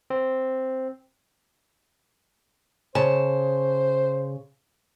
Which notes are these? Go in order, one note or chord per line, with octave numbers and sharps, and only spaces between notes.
C4
C#3 C5 A5